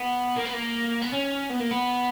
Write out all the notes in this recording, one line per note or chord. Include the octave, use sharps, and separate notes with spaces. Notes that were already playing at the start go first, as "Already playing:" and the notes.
Already playing: B3
A#3
B3
A#3
B3
C#4
B3
A#3
B3